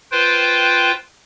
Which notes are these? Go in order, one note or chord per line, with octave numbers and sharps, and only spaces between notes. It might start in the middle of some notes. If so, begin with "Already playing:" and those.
F4 B4 C5 G5